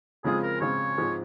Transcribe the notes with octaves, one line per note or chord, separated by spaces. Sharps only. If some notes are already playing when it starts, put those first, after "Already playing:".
C#3 F3 G#3 C4 F4 G#4
A#4
C#3 F3 G#3 C4 F4 C#5
G#2 F3 G#3 C4